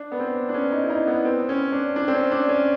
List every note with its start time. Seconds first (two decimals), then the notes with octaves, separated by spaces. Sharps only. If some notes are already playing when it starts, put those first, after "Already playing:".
Already playing: D4
0.12 B3
0.19 C4
0.49 D4
0.54 C#4
0.72 D#4
0.84 E4
0.90 D#4
1.07 B3
1.25 C4
1.49 C#4
1.72 D4
1.96 D4
2.08 C4
2.14 C#4
2.32 D4
2.49 C#4